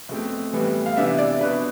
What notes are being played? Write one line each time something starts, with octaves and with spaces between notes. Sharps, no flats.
B2 A3 C4
A2 E3 G3 B3
F5
C3 E3 B3 D4 E5
D5
B2 B3 D4 B4